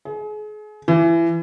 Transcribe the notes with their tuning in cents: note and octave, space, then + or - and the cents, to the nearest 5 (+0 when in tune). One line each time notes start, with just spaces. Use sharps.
G#4 +35
E3 +25